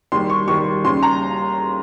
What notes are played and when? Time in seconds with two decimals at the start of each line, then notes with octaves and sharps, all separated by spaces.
0.12 D#2 D#3 G3 C6
0.30 C#6
0.48 D#2 D#3 G3 C#6
0.85 D#2 C#3 G3 C6
1.03 A#5